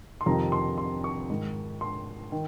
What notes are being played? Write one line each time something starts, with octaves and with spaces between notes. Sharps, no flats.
C6
F2 C3 D#3 A#5
C6
C6
C#6
G#2 D#3
C6
D#3